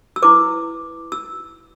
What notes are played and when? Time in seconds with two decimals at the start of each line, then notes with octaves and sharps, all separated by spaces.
0.16 E6
0.22 E4 B4 D6
1.12 E6